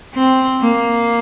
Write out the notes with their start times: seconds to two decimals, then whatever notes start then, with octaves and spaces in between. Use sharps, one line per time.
0.14 C4
0.61 A#3